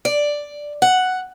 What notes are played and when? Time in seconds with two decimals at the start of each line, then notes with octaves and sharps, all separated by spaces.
0.05 D5
0.82 F#5